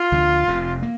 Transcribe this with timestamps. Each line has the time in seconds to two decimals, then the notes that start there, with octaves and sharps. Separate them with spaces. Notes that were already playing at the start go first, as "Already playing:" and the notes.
Already playing: F4
0.12 D2 D3 F3
0.47 F1 F2 C3
0.83 A#3